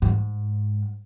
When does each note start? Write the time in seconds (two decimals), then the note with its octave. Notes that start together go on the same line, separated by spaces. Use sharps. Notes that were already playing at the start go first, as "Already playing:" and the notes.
0.02 G#2